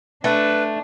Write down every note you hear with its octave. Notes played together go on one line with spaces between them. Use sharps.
A3 D4 B4